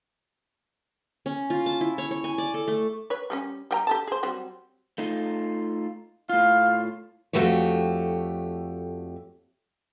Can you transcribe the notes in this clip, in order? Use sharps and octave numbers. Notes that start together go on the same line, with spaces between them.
C#4
F4
A5
E4
C#5
C#5
G#5
D5
A4
A3
B4 C#5
G3 A#3 C#4
G3 G5 A#5
G4 A4 A5
G#4 C5
F#3 G3 C4
A3 D#4 F4
A2 F4 F5
F2 G#2 A3 F#4 G4 C#5